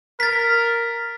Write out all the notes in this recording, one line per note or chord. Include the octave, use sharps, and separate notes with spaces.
A#4 A6 B6